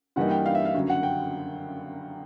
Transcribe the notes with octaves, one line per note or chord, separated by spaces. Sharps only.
G2 E3 G3 A#3 D#4 F#5
G5
F5
E5
F5
F#1 F#2 D3 F#3
F#5
G5